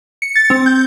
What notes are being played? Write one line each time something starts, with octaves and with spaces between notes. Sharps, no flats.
C#7
A6
C4
G6